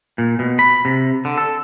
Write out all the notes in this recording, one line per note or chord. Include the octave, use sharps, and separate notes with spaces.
A#2
B2
B5
C3
D3
A4